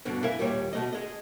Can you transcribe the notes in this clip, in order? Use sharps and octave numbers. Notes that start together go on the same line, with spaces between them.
G2 B2 D3
E4 A#4 E5 F5 G#5
D#2 A#2 G3 C#5
B2 A3 D#5
G#4 D#5